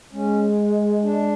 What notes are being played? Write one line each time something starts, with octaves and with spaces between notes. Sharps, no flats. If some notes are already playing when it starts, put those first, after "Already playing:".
G#3 C#4
D4